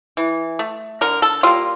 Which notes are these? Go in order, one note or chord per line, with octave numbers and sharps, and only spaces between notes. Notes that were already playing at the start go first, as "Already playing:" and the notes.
E3
A3
D3 A#4
A4
G3 A#3 F4